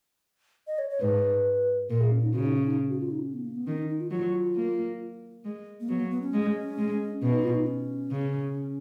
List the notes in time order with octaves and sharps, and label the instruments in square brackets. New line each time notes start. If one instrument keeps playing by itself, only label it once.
[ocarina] D#5
C#5
C#5
[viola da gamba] G#2 [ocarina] B4
[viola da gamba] A#2 [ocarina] A#4
[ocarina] G#4
C#4
D#4
[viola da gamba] C#3 [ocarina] F#4
[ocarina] D#4
C#4
D#4
F#4
F4
D#4
C#4
B3
A#3
B3
[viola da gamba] D#3 [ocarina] C#4
[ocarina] D#4
D#4
F4
[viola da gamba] F#3 [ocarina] F4
[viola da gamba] A#3
G#3
[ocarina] A#3
[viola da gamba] F#3 [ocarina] B3
[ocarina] A#3
B3
C#4
[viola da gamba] G#3
G#3
[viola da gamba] B2 [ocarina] C#4
[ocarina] D#4
F4
D#4
C#4
[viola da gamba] C#3